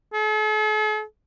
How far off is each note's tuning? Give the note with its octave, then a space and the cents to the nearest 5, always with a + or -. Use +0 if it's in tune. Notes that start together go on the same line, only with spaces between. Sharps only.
A4 -45